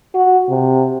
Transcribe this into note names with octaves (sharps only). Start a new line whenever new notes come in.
F#4
C3